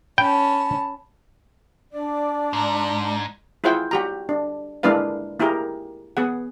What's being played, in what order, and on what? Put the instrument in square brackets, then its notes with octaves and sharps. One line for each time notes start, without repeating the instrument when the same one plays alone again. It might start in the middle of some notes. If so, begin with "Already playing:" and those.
[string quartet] C#4 A5 [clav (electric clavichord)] G5 [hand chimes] B5
[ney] D4 [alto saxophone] D5
[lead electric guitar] G#2 [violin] A#5
[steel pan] E4 F4 G#4 C5 F#5 G5
F#4 G4 A#5
D4
G#3 A#3 D4 E4 B4 F5
A#3 E4 G4 G#4 A#4
B3 G#4 F#5